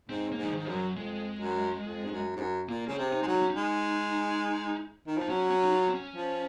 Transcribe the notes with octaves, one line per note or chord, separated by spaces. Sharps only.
G#2 C4
A#3
G#2
F3
G#2 D#3
F#2 F3
F#3
F2 G#3
F#2
F2
G#2
F#2
G#2
F#2
A#2 A#3
C#3 C4
C3
D#4
G#3
F#3
D#4
C#4
D#4
G#3
D#3
F3 D#4
F#3 C#4
C#4
D#4
F4
C4
C#4
F3